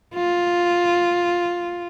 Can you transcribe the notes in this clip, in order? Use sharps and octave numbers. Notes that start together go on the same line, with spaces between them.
F4